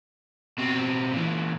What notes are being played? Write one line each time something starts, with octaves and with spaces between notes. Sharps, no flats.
B2 C4
A#2 E3